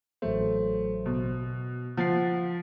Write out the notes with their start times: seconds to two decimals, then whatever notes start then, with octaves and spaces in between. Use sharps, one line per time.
0.22 A1 F#3 A3 C5
1.05 B2
1.97 F3 F#5 A6 C7